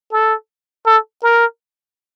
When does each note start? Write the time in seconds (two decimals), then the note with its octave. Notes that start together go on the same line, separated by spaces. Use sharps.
0.12 A4
0.86 A4
1.23 A#4